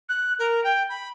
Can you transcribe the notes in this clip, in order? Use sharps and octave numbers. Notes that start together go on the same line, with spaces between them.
F#6
A#4
G5
B5